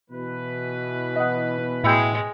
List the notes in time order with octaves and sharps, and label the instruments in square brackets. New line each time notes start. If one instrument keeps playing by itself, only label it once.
[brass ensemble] B2 E3 B4
[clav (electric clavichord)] D#5 F#5
[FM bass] A2 [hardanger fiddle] G#3 [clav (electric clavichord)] E4 G5